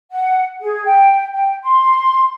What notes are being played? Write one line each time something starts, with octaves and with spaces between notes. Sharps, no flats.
F#5
G#4
G5
G5
C6